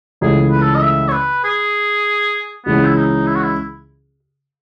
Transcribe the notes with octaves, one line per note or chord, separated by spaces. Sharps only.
C#2 C#3 E3 A3 C#4 G#4
B4
A4
D#5
E5
C#5
B4
G#4
C#2 C#3 E3 G#3 B3 C#4
E4
D#4
E4
F#4
E4